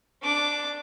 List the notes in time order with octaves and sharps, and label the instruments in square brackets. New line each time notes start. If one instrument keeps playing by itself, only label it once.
[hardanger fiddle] D4 D6